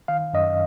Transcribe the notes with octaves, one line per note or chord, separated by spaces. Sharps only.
D#3 F5
F#2 D#5